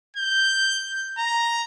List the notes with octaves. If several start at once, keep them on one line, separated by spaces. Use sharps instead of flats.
G6
A#5